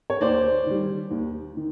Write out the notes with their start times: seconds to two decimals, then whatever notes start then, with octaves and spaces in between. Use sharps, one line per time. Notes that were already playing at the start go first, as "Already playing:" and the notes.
0.10 C#5
0.21 D#2 C5 D5
0.66 D#3 G3
1.11 D#2
1.57 D#3